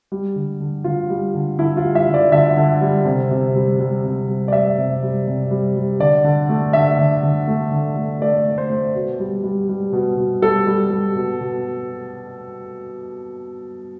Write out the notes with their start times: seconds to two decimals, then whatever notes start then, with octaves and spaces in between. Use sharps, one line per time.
0.12 G3
0.36 D3
0.60 D3
0.84 D3 F4
1.10 G3
1.35 D3
1.59 D3 E4
1.77 F4
1.83 G3
1.95 E5
2.07 D3
2.14 D5
2.32 D3 E5
2.57 D3
2.81 G3
3.05 C3
3.31 C3
3.56 G3
3.80 G3
4.04 C3
4.28 G3
4.48 D5
4.53 G3 E5
4.78 C3
5.02 G3
5.27 C3
5.51 G3
5.76 G3
6.00 D3 D5
6.24 D3
6.49 A3
6.73 D3 E5
6.99 D3
7.23 D3
7.48 A3
7.72 D3
7.96 A3
8.21 A3 D5
8.45 A3
8.58 C5
8.70 A3
8.94 B2
9.20 G3
9.44 G3
9.69 G3
9.93 B2
10.17 B2
10.42 G3 A4
10.66 G3
10.91 G3
11.15 B2
11.41 B2